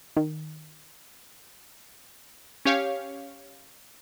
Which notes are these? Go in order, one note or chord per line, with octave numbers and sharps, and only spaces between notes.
D#3
C#4 G4 C#5 F5